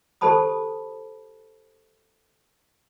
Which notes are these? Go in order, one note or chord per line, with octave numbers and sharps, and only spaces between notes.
G4 A4 C5 A5 B5 D#6